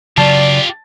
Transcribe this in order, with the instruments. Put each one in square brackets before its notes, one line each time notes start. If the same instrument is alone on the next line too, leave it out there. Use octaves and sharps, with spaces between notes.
[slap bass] C#3 F#3 [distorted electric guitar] F4 G4 [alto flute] D5 [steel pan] A5